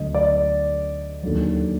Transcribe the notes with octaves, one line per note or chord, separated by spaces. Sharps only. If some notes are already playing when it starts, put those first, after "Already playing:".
Already playing: D2 D3 F#3 D#5
D5
D#2 D3 F#3